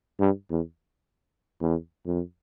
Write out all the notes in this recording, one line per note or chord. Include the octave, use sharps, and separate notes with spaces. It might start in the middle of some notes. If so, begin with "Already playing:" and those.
G2
E2
E2
F2